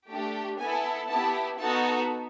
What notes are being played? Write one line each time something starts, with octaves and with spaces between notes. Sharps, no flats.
A3 D4 G4
B3 E4 A4 G#5
B3 E4 G4 A5
B3 D#4 F#4 A4 A5